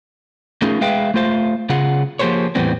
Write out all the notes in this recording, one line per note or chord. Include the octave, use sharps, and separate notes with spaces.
A3 C#4 D#4 F4 G#4 A#4
G#3 G#4 B4 E5 F5 G5
A3 F4 C5 F5
C#3 F4 G#4 F#5
F3 A#3 G4 G#4 C5 C#5
E2 A2 E3 G3 B3 C4